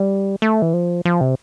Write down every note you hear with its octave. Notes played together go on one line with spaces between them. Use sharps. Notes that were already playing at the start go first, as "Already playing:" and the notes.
Already playing: G3
A3
E3
F3
F3
C3